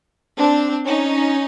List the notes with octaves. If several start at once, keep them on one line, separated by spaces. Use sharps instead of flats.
C4 D4
C#4 D#4